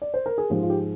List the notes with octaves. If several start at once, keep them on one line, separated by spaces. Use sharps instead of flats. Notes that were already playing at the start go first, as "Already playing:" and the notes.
D5
C5
A#4
G#4
G#2 F3 G#3 G4
F4
G4